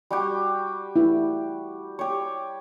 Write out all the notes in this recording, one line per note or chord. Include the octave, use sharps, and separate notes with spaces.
G3 F#4 G4
E4
G4 C#5